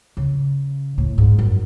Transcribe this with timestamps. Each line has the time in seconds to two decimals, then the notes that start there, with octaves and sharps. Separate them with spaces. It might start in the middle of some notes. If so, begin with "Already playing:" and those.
0.17 C#3
0.98 A2
1.18 G#2
1.39 F#2